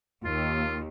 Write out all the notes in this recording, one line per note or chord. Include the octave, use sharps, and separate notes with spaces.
D#2 F4